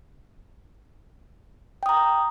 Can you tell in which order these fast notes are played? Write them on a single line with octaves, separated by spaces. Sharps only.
G5 D#6 A#5